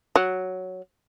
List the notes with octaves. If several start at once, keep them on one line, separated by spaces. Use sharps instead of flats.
F#3